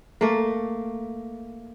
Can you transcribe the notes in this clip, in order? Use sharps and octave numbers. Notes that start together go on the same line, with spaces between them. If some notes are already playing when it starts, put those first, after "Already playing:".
A3 A#3